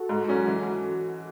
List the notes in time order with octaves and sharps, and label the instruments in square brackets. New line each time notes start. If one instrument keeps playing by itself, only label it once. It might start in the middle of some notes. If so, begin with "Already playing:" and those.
Already playing: [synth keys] F#4 A4
[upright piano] G#2
F#3 C#4
E3